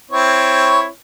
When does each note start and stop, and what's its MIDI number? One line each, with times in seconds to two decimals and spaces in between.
0.11 0.87 60
0.11 0.87 64
0.11 0.87 73